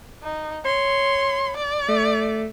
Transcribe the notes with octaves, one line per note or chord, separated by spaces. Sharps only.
D#4
C#5 C6
D5
A3